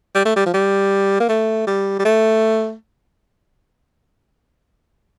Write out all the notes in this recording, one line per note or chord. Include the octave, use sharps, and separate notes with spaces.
G3
A3
G3
F3
G3
A#3
A3
G3
G3
A3